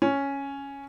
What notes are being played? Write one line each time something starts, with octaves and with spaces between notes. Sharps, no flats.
C#4